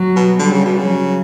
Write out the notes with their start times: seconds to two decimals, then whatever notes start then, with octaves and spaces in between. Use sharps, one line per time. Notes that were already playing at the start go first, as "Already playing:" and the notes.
Already playing: F#3
0.16 B2
0.39 D3 G3
0.52 C#3
0.65 B2
0.77 C#3
0.87 F#3